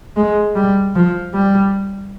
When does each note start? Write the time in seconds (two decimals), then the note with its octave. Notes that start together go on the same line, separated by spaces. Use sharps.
0.17 G#3
0.55 G3
0.95 F3
1.34 G3